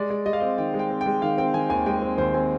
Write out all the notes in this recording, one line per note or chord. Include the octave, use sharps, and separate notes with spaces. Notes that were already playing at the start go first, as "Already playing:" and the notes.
Already playing: G#3 D5
G#3
G#3 D#5
F5
C4 D#5
D#3 G5
G#3
G5
C4
G5
G#3
D#3 F5
C4 G5
D#3 G#5
D#2 G#5
G#3 G5
C4
D#2 C5
C4 G#5